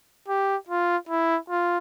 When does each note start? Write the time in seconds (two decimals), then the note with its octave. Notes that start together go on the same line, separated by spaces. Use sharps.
0.28 G4
0.69 F4
1.09 E4
1.50 F4